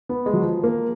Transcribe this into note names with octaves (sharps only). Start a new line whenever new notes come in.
B3
G#3
F#3
F3
A#3